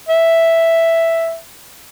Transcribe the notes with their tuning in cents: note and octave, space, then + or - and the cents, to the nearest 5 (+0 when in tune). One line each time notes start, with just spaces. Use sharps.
E5 +0